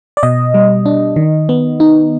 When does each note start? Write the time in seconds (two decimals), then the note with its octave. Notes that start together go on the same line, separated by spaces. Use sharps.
0.17 D5
0.23 B2 D#5
0.54 G3
0.86 D4
1.16 D#3
1.49 B3
1.80 D#4